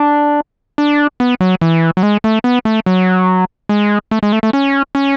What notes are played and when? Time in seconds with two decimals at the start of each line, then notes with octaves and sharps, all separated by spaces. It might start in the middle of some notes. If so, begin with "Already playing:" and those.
Already playing: D4
0.78 D4
1.20 B3
1.41 F#3
1.61 E3
1.97 F#3
2.03 G#3
2.24 A3
2.44 B3
2.65 A3
2.86 F#3
3.69 G#3
4.11 A3
4.23 G#3
4.33 A3
4.43 A3
4.53 C#4
4.95 C#4